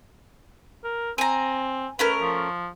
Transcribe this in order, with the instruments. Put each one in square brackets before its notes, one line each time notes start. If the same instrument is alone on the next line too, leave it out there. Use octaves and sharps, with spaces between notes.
[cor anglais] A#4
[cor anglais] C4 [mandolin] G#5 A#5
[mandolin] A3 C#4 A#4 [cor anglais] B4
[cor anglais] F3